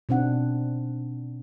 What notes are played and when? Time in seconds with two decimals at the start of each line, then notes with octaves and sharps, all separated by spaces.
0.09 B2 D3 C4 D4 D#4 F#5